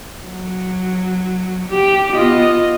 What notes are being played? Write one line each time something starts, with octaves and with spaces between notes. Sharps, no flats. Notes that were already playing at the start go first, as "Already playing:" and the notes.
F#3
G4
B3 F4 D#5